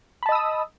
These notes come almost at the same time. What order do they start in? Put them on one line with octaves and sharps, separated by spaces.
B5 A5 D#5 E6 D#6